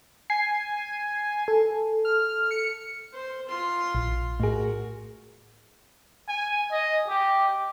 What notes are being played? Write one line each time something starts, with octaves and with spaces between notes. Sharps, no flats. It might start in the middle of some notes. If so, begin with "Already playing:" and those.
G#5 C7
A4
F6
C#7
C5
F4 C6
A#1
A2 F#4 G#4 A#4
G#5
D#5
G4